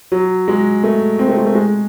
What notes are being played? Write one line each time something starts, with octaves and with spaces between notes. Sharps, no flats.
F#3
G#3
A3
C4
A3
G#3
A3
G#3